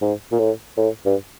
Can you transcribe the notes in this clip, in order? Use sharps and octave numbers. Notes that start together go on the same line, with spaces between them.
G#2
A#2
A2
A2
G2